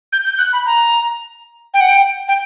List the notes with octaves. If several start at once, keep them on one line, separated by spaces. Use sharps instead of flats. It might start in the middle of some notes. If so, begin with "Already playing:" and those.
G6
G6
F#6
B5
A#5
G5
F#5
G5
G5